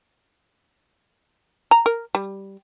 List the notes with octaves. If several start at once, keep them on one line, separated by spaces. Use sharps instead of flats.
A#5
A#4
G3